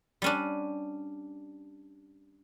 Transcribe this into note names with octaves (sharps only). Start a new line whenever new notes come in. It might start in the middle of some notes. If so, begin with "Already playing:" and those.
G3 C#4 D4